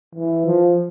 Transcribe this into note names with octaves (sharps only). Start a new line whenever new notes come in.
E3
F3